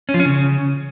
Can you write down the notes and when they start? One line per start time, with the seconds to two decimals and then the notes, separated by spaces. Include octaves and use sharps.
0.09 C#4
0.14 F3
0.20 C#4
0.25 C#3